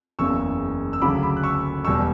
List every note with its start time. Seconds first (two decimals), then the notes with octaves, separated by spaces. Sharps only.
0.19 F#1 E2 C#3 C#6 E6
0.93 E6
1.01 D2 C#3 F#3 B5 D6
1.23 B5 D6
1.37 F#6
1.43 C#6 E6
1.84 E1 E2 B2 G3 C#6 E6